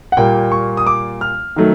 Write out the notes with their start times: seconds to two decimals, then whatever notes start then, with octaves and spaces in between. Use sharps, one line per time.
0.12 F#5
0.17 A#2 G3 A#3 G5
0.52 C#6
0.77 D#6
0.87 D6
1.21 F6
1.56 D#3 F#3 A3